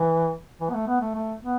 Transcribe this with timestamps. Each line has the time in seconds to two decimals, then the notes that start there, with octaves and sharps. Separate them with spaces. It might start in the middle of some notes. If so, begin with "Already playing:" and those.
Already playing: E3
0.61 E3
0.70 B3
0.74 A3
0.88 B3
1.01 A3
1.15 A3
1.43 B3